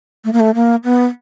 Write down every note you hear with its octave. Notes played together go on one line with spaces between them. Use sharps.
A3
A#3
A3
A#3
B3